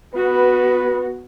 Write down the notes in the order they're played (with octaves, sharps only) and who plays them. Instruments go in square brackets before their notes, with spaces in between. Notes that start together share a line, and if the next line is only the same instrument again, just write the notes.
[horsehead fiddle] B3 F#4 [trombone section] B4